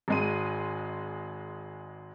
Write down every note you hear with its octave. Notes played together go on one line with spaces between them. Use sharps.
G#1 G#3 D#7